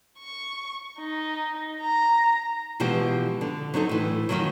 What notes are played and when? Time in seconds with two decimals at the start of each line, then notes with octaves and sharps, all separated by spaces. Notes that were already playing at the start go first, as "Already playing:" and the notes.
0.19 C#6
0.99 D#4
1.81 A#5
2.80 B2 E3 F3 G#3 G4
3.41 D3
3.74 F#3 C4 D#4 A4
3.89 A2 E3
4.29 F#2 A#2 D#3 F3 F#3